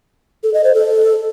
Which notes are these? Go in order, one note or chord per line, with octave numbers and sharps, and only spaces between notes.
A4
D#5
C5
A4